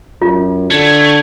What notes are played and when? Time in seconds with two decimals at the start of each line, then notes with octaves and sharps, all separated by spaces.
0.22 F#2 F4
0.71 D3 A3 G#6